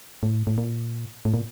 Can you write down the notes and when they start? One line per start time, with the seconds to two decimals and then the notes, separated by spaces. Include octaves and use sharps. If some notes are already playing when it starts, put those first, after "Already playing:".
0.23 A2
0.47 A2
0.58 A#2
1.25 A2
1.34 A#2